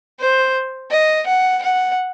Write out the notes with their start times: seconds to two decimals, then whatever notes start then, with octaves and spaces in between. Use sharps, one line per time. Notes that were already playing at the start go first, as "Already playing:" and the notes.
0.20 C5
0.91 D#5
1.26 F#5
1.63 F#5